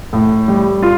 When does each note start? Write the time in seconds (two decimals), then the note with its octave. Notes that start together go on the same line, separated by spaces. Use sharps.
0.13 A2
0.48 G3
0.82 F4